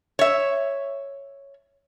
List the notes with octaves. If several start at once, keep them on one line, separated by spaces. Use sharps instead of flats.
C#5 E5